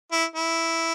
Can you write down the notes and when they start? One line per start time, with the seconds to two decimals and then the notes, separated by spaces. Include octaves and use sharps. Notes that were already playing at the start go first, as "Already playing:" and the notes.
0.12 E4
0.36 E4